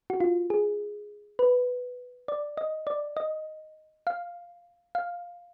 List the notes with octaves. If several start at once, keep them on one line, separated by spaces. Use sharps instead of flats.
F#4
F4
G#4
B4
D5
D#5
D5
D#5
F5
F5